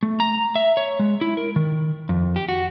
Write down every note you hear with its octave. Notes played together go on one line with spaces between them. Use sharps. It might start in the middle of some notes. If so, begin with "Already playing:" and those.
A3
A#5
E5
C#5
G#3
E4
A#4
D#3
F2
G4
F#4